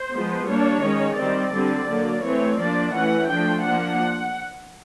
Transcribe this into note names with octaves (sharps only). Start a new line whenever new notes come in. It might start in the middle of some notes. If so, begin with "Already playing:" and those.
Already playing: C5
F3 G#3 B3
G3 A#3 D4 C#5
D#3 G#3 C#4
D#3 G3 C4 D5
D3 G3 C4
D3 F#3 A#3
E3 A3 C4 C#5
F3 A#3 D4 D5
E3 A3 C#4 F#5
F3 A3 D4 G5
F3 A#3 D4 F#5